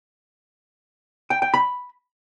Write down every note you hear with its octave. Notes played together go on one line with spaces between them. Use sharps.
G5
G5
B5